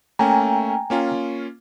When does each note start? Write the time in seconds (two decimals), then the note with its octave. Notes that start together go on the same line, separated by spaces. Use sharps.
0.19 A3 A#3 C#4 G5 G#5 A#5
0.90 A#3 C#4 F4